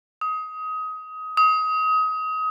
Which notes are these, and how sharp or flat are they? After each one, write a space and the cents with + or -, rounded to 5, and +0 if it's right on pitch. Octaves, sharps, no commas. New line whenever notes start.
D#6 +20
D#6 +25